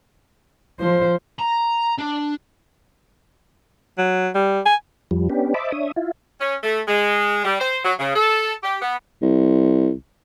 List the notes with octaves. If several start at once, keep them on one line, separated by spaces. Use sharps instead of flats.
F3 C5
A#5
D4
F#3
G3
G#5
F2 F3 G3
B3 C#4 D4 G4
C5 D#5 E5 A5 B5 D6
D4 C#5 E5 D#6
E4 F4
C#4
A3
G#3
G3
C5
F#3
C#3
A4
G4
B3
C2